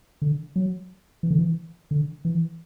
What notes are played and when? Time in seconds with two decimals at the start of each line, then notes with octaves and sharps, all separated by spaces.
0.22 D3
0.56 F#3
1.23 E3
1.31 D3
1.39 E3
1.91 D3
2.25 E3